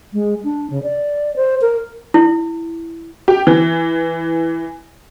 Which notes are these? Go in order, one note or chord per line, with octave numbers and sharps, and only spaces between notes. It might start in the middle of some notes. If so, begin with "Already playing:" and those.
G#3
D4
C#3
D5
C5
A#4
E4
G4
E3